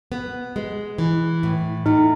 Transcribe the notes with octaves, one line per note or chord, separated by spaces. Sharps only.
B3
G#3
E3
A2
A2 D#4